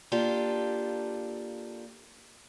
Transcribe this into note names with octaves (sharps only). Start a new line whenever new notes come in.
A#3 D4 F4 G4 A4